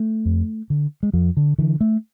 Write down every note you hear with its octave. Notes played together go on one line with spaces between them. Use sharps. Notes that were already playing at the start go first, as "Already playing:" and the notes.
Already playing: A3
F2
D3
G#3
F2 F3
D3
D3 E3
A3